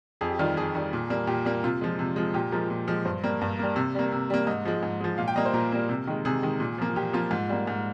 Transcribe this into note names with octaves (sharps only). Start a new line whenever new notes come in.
F2 G#4
G4
D#3 G3 F4
F2 G#4
D#3 G3
A#2
G3 A#3
A#2 G4
G3 A#3
C3 F4
F3 G#3
C3
F3 G#3
A#2 G4
F3 G#3 A#4
A#2
F3 G#3
G2 C5
G3 A#3
G2
G3 A#3
C3
G3 A#3
C3
G3 A#3
G#2 D#5
F3 G#3
G#2
F3 G#3
A#2 F5
G5
G3 A#3 D#5
C5
A#2 A#4
G3 A#3
C3
D#3 G#3
C3 G#4
D#3 G#3
A#2
F3 A#3
A#2 G4
F3 A#3 F4
G#2
G3 A#3
G#2